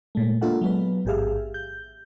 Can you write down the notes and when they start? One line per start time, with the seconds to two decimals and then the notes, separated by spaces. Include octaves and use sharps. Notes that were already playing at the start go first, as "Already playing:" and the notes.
0.15 A#2 G#3 A3
0.41 A#3 D4 F4 A4 E5 F#5
0.61 F#3 G#3 B3 B4
1.05 A1 G#2 G4 G#4 E5 F5
1.54 G6